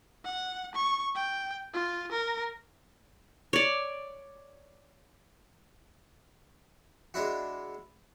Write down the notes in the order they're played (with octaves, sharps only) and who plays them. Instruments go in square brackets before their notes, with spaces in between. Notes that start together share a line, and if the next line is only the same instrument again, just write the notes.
[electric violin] F#5
C#6
G5
F4
A#4
[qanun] C#5 D5
[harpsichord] G#3 D4 E4 F#4